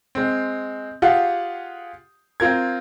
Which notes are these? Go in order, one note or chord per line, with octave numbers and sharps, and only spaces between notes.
G#3 C4
F4 G4 G#4 F5 F#5
C4 F4 A#4 G#6